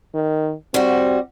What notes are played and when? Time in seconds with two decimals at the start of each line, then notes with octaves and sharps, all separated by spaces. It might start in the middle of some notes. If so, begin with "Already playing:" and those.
0.15 D#3
0.74 G3 C4 F#4